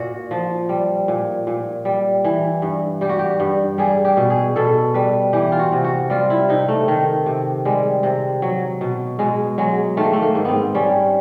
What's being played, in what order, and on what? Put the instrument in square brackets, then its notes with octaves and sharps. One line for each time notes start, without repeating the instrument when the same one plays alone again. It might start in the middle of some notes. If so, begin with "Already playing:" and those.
Already playing: [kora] A#2 F#4
F3
G3
A#2
A#2
G3
E3
G2
G3 G4
F#4
G4
G2
G3 G#4
G4
B2
G#4
B2 A4
G3 B4
E3 G4
F4
F#4
C3
F#4
G3 F4
E4
C3 D#4
A3
D#3
C3
G3 G#3
C3
F#3
B2
B2 G#3
F#3 G#3
D#3 A3
A#3
A3
A#3
G#2
B3 C4
G3 C#4